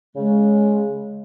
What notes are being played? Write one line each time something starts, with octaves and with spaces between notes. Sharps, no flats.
C#3 G#3